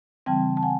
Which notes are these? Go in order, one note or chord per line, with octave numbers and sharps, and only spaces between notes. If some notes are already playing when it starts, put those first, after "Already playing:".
C#3 E3 G3 C4 G5 A5
A5
F#5 G#5